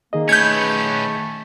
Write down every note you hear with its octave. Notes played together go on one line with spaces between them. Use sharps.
D#3 A#3 G#4 D#5
A3 C#4 B4 G6 G#6